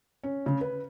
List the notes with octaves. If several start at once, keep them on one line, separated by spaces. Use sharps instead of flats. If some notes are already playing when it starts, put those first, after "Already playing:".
C#4
C#3
B4